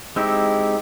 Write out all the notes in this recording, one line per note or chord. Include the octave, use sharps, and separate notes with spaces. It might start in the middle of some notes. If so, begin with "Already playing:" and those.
G#3 C4 D#4 E4 G4